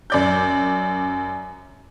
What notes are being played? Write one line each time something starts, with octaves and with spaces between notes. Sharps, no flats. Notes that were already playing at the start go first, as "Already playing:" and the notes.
F#2 D5 G6